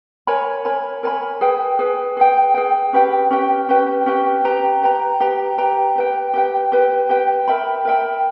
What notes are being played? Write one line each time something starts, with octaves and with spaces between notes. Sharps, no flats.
A#4 C#5 G#5 B5
A#4 C#5 G#5 B5
A#4 C#5 G#5 B5
G#4 B4 G5
G#4 B4 G5
G#4 B4 G5
G#4 B4 G5
C#4 G4 B4 G5
C#4 G4 B4 G5
C#4 G4 B4 G5
C#4 G4 B4 G5
G4 B4 G5 A#5
G4 B4 G5 A#5
G4 B4 G5 A#5
G4 B4 G5 A#5
G4 B4 G5
G4 B4 G5
G4 B4 G5
G4 B4 G5
A#4 E5 G5 B5
A#4 E5 G5 B5